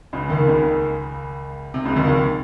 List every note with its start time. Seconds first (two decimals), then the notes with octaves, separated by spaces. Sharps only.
0.13 C#2 C#3
0.29 D#2 D#3
0.48 C#2 C#3
1.74 C3
1.85 C#2 C#3
1.96 D#2 D#3
2.08 D#2 D#3